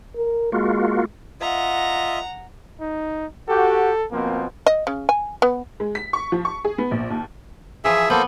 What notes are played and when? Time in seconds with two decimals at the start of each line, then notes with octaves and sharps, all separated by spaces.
0.16 A#4
0.52 G#3 A#3 F4 F#4
1.41 F4 D#5 E5 F#5 A#5
2.81 D#4
3.49 F#4 G4 A4
4.12 B2 F3 A#3 C4
4.66 D#5
4.87 C#3
5.09 G#5
5.42 B3
5.80 G#3
5.95 B6
6.13 C#6
6.32 F3
6.45 C#6
6.65 G#4
6.78 B3
6.91 A#1
7.10 D#2
7.85 E3 F3 G#4 E5
8.10 A#3 B3 A4 C5